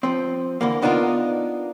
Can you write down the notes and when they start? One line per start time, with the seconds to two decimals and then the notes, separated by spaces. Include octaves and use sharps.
0.03 F3 C4
0.61 D3 E3 A#3
0.82 B3 D4 D#4 F4 A#4